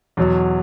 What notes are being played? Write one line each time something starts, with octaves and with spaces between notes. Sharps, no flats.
E2 B2 F#3